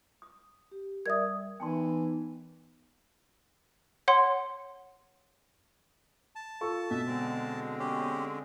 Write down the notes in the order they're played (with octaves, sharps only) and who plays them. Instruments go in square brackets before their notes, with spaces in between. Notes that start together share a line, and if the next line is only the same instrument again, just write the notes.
[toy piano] D#6
[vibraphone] G4
[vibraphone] G3 [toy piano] A#4 D5 E5 [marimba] D#6 G#6
[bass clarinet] E3 [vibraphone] B3 D#4 [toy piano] G5 A5 C6
[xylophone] C#5 F#5 C6
[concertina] A5
[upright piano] F4 A4 C#6
[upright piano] B2 [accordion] E5
[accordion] D3 G#3 C4
[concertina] C#4 G4